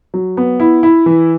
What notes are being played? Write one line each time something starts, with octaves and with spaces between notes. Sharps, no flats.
F#3
B3
E4
E4
E3